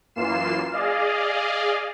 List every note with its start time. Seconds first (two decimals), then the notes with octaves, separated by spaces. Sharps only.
0.15 F#2 E3 A#3 F4 C7 E7
0.71 G#4 D5 D#5 F5